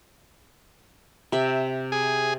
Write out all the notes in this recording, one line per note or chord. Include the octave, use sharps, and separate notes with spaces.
C3 E5
G#4